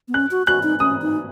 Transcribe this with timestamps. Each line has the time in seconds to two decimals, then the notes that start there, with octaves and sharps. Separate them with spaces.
0.08 B3
0.14 C#4 F#6
0.31 F#4
0.47 F#4 F#6
0.63 D#4
0.80 C#4 D#6
1.02 D#4